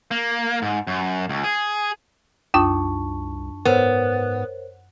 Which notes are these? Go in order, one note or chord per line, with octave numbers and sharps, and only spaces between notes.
A#3
G#2
F#2
C#2
G#4
C2 F#2 D4 F4 A5 C#6 D#6
G#2 B3 A#4 C5 C#5